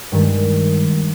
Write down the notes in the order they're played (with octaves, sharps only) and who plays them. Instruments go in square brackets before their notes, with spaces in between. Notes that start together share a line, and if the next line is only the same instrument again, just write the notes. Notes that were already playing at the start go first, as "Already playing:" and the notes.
[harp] G2 D#3 G#3